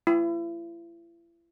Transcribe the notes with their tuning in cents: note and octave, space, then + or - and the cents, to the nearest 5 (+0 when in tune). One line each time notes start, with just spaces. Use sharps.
E4 +40